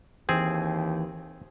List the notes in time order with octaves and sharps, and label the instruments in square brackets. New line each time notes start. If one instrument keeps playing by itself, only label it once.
[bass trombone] D#2 [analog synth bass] E3 [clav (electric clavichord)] C4 G#4